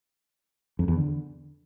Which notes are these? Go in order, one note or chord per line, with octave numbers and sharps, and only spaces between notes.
F2
E2
D3